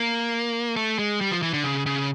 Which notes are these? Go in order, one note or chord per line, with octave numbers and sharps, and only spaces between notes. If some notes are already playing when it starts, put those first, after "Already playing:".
Already playing: A#3
A3
G#3
G3
F3
E3
D3
C#3
C#3